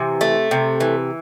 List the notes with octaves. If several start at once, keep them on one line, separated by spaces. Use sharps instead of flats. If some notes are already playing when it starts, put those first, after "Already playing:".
Already playing: C3 E3
A3
C3
E3